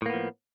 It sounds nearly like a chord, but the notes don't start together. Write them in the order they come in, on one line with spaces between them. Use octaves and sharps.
A2 A#3 B3 F3